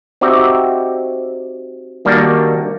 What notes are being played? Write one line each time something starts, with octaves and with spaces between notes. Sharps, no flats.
C4 D#4 F#4 G4 D5 E5
D#3 G3 A#3 D4 F#4 D5